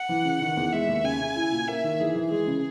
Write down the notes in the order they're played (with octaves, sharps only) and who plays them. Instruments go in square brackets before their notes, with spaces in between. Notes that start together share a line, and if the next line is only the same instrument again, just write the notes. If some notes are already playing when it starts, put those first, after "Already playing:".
Already playing: [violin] F#5
[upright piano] E3
C#3
D#3
E2
[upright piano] G#3 [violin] E5
[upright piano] D#2
[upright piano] C#3 [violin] G#5
[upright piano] C#3
E4
A#2
[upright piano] A#3 [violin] E5
[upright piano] D#3
[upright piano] E3 [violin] G#4
[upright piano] E3
[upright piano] G#3 [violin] G#4
[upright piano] C#3